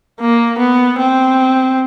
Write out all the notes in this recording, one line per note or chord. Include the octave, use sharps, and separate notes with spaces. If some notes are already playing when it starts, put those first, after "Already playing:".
A#3
B3
C4